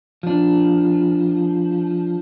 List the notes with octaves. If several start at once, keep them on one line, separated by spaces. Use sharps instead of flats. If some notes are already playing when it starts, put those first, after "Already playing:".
F3 D4